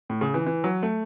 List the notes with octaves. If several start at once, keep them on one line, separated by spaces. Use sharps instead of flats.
A2
C#3
E3
E3
F#3
A3